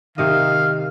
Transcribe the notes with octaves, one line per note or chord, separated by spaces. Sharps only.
C3 D#3 D#5 F5